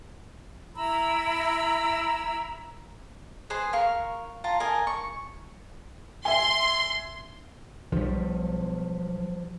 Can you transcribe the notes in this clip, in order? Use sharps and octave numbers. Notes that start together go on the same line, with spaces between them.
E4 A#5 B5 E6
G#4 B4 C5 D#5
A#4 F5 C#6
F4 A5 A#5
A#4 D#5 G#5 A5
C#6
E5 G#5 C6
B1 F3 G3